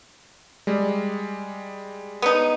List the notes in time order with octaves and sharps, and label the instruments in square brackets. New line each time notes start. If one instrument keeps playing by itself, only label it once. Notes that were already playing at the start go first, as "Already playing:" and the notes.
[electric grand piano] G3 G#3
[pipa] B3 D#4